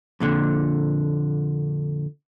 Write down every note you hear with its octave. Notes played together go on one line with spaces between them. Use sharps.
F2 A#2 D3